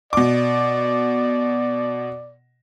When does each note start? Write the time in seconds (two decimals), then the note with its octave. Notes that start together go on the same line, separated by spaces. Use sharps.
0.13 B2 D5 D6